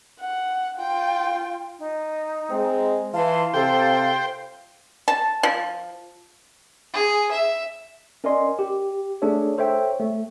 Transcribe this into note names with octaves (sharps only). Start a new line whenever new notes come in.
F#5
F4 G5
D#4
G#3 C4
E3 F4 A5 C6
C3 A4 C5 G5
A5
F3
G#4
E5
C#4 A#4 D5 D#5 G#5 C6
G4
A3 D4 G#4 A4 C#5
A4 C5 C#5 E5 G5
A3